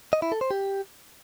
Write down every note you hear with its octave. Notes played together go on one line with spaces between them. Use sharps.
D#5
E4
A4
C5
G4